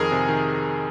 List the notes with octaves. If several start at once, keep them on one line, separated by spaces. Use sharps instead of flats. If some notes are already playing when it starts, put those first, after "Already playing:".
Already playing: F2 D#3 G#4 A#4
C3
D#3